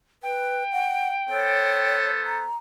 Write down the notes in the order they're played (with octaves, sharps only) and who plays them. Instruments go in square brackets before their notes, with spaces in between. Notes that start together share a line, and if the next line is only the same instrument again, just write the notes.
[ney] B4 [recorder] G5
[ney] F#5
[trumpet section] B3 A4 C5 [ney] C#5
[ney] A#5